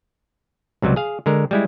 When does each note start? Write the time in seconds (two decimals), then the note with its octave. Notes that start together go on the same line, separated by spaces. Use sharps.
0.82 C#2 C3 F#3 G3
0.96 G#4 F5
1.26 D3 G#3 A#4
1.51 G3 G#3 E4